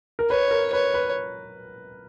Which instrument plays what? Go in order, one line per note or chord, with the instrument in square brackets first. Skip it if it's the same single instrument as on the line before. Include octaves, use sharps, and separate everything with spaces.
[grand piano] A#4
[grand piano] B4 [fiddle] C#5
[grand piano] A#4
[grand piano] B4 [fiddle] C#5
[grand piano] B4